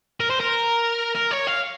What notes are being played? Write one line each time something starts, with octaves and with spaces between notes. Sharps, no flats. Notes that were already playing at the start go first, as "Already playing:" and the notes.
A#4
C5
A#4
A#4
C#5
F5